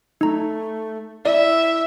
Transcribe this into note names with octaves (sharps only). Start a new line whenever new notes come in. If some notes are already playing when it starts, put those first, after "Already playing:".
A3 D#4 A#5
E4 D5 E5